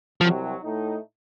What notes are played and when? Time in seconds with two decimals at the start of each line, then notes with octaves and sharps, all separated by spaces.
0.20 C2 C3 F3 F#3
0.63 A2 A3 D#4